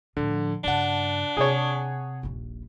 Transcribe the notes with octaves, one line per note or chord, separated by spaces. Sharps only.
A2 D3 F3
G2 C#3 D4 F#5 A5
C3 G#4 C#5
D#1 A#1